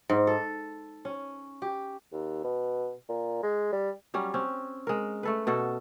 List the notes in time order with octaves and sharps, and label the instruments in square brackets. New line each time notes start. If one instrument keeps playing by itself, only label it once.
[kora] G#2
A4
C#4
G4
[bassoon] D#2
B2
A#2
G#3
G3
[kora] F#3 G3 C#4
C4 C#4
G#3 A#4
A3 A4 B4
B2 F#4 A4